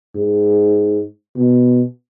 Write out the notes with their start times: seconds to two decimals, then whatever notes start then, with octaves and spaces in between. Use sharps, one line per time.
0.15 G#2
1.36 B2